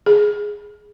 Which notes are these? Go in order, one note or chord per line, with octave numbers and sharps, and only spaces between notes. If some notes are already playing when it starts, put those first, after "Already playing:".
G#4